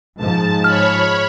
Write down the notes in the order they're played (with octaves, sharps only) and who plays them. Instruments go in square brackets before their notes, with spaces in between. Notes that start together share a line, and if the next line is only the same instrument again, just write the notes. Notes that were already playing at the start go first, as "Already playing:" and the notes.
[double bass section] G#2 F3 [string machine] A5
[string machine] C#5 B5 [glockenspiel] F6